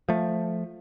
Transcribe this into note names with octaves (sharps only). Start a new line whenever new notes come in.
F3 A3